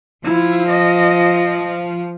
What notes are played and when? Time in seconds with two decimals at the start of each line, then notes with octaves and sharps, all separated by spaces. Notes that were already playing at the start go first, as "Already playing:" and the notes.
0.24 F3 E4
0.69 D#5